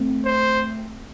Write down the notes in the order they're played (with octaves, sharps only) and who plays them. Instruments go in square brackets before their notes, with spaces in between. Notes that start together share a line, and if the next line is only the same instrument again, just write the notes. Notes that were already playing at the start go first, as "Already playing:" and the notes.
Already playing: [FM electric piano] A3 C4
[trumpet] C5